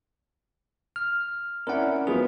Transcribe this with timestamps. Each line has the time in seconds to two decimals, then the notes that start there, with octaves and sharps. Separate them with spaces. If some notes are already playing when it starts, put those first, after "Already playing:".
0.96 F6
1.67 C#4 E4 A#4 D5 F#5
2.07 F3 F#3 B3 G#4